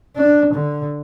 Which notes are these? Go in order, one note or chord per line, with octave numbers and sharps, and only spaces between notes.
D4
D3